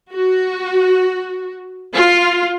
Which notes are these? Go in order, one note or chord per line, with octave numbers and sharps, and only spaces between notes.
F#4
F4